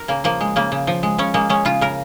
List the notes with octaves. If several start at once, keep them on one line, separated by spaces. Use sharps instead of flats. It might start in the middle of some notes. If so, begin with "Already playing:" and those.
Already playing: A#4
C#3 A#3
F3 A#3
G#3
C#3 A#3
C#3
F3
G#3
C#3 C#4
G#3 A#3
G#3 C#4
C#3 F4
C#3 A#4